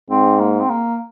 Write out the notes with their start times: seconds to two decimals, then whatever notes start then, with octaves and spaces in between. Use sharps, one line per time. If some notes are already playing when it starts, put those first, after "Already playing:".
0.10 G#2 C4
0.40 A#3
0.60 C4
0.70 A#3